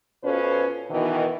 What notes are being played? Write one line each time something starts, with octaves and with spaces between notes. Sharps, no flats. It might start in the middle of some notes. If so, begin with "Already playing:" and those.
B2 C#4 F4 A4 B4 C5
B2 D#3 E3